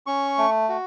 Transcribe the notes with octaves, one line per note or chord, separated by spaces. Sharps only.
C#4 C#6
A3
F#4